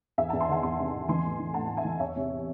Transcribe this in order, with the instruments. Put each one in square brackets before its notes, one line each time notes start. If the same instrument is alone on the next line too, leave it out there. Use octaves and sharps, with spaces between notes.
[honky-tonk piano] E2 E5 G#5
E2 F#5 A5
G#5 C6
D#3 F#5 A5
E2 G#5 C6
C3
E2
E3 G#5 C6
A2
E3
A2 F#5 A5
A2
E5 G#5
E3
E2 C#5 E5
C3